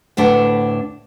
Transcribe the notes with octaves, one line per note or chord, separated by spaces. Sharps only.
D2 A2 D4 B4 F#5